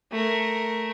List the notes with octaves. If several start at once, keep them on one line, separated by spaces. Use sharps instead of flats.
A3 A#4